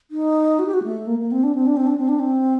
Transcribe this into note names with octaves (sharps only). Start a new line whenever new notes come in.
D#4
F#4
G4
F#4
A3
A#3
A#3
C4
D4
C4
D4
C4
D4
C4
D4
C4